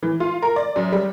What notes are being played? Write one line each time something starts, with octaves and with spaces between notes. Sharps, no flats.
E3
F4
A#4
D5
F#2
G3